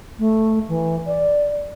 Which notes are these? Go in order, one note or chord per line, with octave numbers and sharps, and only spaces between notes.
A3
E3
D5